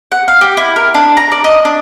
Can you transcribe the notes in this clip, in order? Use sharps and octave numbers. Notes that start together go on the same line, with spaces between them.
F#5
F5
G4
E4
A#4
D4
A#5
D5
D#5
D4